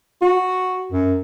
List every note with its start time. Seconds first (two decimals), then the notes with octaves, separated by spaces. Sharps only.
0.21 F#4
0.92 F#2